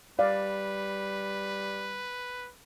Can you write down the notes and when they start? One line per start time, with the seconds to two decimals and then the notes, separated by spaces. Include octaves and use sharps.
0.19 G3 B4 D5 F5